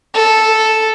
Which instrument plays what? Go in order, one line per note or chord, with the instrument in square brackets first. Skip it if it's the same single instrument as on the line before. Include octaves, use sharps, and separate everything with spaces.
[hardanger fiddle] A4